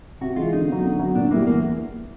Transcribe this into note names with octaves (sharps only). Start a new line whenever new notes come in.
C3 F#4
E3 G#3 F4
D3 D#4
F#3 B3
D3
F#3 B3
A#2 D4
G3 A#3 B3 E4
E2 A#3